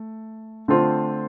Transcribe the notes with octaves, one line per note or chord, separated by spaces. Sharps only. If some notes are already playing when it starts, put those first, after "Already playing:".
Already playing: A3
D3 A3 C4 F4 C5